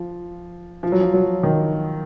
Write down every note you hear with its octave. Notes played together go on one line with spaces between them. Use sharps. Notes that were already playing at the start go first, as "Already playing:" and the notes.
Already playing: F3
F3
F#3
F3
F#3
D#3